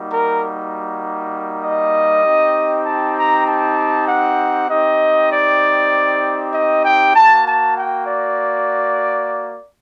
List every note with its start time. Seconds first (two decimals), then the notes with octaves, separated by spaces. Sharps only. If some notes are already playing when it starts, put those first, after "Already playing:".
Already playing: G3 A#3 D#4 F#4
0.08 A#4
1.63 D#5
2.24 C4 D#4 G4
2.85 A5
3.16 A#5
3.46 A5
4.07 F#5
4.69 C4 D#4 G4 D#5
5.30 D5
6.53 D#5
6.83 G5
7.14 A#3 F#4 A5
7.45 A5
7.76 G5
8.06 D5